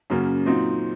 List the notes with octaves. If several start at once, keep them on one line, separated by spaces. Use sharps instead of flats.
F#2 C#3 F#3 A#3 C#4
A#2 F#3 C4 D#4